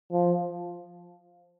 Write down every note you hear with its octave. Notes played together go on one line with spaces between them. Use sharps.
F3